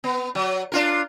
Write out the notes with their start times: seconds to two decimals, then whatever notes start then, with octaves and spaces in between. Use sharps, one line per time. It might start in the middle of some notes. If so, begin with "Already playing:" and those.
0.04 B3
0.35 F#3
0.72 D4 F4 A#4